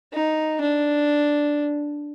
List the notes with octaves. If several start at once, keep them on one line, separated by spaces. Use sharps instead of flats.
D#4
D4